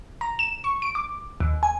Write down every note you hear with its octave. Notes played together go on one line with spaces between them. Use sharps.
A#5
E7
C#6
D7
D6
D#2
G#5